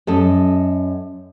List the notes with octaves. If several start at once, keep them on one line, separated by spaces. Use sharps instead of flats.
F#2 A4 D#5